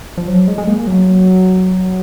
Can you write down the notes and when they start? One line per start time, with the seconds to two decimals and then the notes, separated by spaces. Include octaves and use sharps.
0.18 F3
0.28 F#3
0.48 G#3
0.58 G#3
0.67 A#3
0.87 F#3